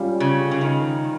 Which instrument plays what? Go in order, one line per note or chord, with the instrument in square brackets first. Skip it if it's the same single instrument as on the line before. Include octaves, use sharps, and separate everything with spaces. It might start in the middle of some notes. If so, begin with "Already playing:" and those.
Already playing: [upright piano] G3 C#4 F4
[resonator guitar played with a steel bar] C#3
C#3
D#3